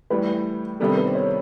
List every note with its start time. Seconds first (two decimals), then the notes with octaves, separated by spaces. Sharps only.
0.10 A2 E3 G3 B4
0.80 C3 D#3 G3 B3 D4 A4
0.88 A#4
0.97 B4
1.06 C5
1.15 C#5